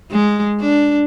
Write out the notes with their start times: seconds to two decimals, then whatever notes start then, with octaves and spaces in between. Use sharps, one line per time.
0.12 G#3
0.61 D4